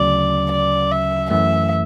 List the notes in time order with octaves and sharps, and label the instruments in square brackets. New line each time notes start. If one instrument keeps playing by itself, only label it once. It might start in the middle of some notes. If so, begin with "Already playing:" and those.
Already playing: [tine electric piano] D2 C#3 F#3 C#4 [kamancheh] D5
[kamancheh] D5
E5
[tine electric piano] F#2 E3 A3 [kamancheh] E5